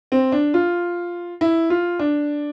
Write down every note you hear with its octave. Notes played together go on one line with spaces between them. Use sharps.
C4
D4
F4
E4
F4
D4